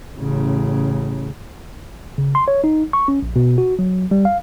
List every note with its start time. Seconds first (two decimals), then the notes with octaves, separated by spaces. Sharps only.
0.17 A1 C#3
2.18 C#3
2.35 C6
2.48 C#5
2.64 D#4
2.93 C#6
3.08 C#4
3.23 A#1
3.36 B2
3.58 F#4
3.79 F#3
4.11 G3
4.25 F5